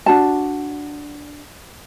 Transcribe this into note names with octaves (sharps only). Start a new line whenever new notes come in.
D4 F#4 A5